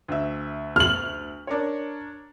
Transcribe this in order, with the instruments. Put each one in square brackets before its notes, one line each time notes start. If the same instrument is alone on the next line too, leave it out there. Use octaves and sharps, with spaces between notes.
[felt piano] D2 E5
[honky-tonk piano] F6 F#7
[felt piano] D4 A#4 C#5